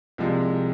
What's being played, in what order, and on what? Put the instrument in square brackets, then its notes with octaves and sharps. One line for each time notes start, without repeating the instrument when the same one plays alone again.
[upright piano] C2 C3 F3 G#3